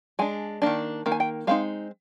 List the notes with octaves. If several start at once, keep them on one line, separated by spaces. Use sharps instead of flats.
G#3 D4 G#5
D#3 A#3 D4
D#3 A#3
G#5
G5
G#3 C4 D#4 F5